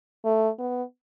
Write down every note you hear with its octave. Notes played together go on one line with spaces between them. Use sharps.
A3
B3